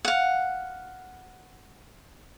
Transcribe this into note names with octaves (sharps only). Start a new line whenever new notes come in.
F5 F#5